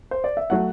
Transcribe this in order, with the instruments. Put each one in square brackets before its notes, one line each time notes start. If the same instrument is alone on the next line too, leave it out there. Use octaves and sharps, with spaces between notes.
[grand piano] C5
D5
E5
[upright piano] F#3 A3 [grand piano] F#5